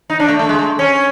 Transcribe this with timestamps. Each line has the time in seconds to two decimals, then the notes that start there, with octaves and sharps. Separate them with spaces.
0.10 D#4
0.20 D4
0.29 A3
0.39 A3
0.49 G#3
0.59 A3
0.79 C#4